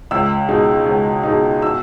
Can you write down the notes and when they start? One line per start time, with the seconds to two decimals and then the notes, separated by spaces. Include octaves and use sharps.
0.11 C#2 E6
0.48 B2 G#3 D#4
0.86 C#2
1.23 B2 G#3 D#4
1.62 B2 E6